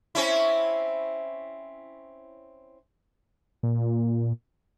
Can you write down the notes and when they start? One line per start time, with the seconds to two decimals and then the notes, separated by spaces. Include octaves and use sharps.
0.15 C4 C#4 E4
3.63 A#2